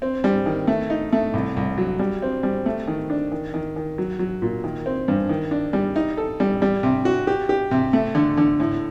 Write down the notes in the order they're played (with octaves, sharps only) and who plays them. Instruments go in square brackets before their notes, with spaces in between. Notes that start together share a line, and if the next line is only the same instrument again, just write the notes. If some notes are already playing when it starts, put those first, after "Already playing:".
[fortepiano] C4
G3
D#3
A3
D#4
A3
C2
C2
F#3
G3
C4
G3
A3
D#3
D4
D#3
D#3
D#3
F#3
F#3
A#2
D#3
C4
G2
D#3
D4
G3
D#4
A4
G3
G3
C3
F#4
G4
G4
C3
A3
D3
D3
A2